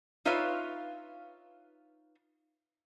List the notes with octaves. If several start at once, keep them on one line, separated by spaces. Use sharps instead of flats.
D#4 F4 B4 C#5 E5 F5